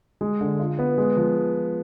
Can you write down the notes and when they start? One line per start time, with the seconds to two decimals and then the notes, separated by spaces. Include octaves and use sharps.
0.21 G#3
0.41 D3
0.59 F4
0.79 B3
0.98 G#3
1.17 F3